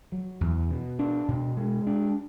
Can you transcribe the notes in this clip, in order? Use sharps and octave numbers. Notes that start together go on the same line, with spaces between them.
F#3
E2
B2
D4
B2
G#3
D4